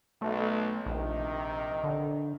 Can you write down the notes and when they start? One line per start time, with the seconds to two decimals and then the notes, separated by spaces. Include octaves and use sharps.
0.22 B1 A3
0.86 A#1 C3 D#3
1.84 D3